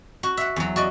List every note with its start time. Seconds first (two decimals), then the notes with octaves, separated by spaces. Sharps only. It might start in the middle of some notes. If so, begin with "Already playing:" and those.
0.23 F#4
0.37 E5 F#5
0.56 E2 F#3
0.76 F#4 D5 D#5